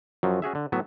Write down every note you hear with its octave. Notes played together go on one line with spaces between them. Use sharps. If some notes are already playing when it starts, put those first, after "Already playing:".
F#2 F3 F#3
C#4 F#4 G#4 E5
D3
A2 F#3 B3 E5